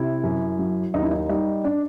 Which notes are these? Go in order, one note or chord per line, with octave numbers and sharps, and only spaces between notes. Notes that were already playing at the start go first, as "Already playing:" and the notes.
Already playing: C3 E4
F#2
F#3
D#2 D#4
E4
D#4
G3 D#4
D4